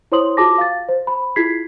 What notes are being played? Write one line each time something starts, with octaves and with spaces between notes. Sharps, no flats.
E4 C5 C#5 C6 D#6 F#7
F4 F#4 G#4 A5 D6 A#6
F5 A6
C5
B5
E4 F4 G#4 G#6 B6 C7